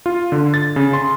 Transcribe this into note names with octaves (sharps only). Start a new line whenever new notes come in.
F4
D3
A6
C#3
C6